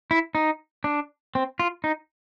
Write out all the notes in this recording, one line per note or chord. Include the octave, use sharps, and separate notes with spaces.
E4
D#4
D4
C4
F4
D#4